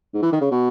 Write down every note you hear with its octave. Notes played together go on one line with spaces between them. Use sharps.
G#2
E3
D#3
C#3
B2